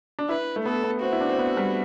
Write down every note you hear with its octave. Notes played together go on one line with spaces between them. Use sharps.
D4
E4 B4
A3
B3 A4
B3
C4 F#4
E4
D4
C4
B3
G3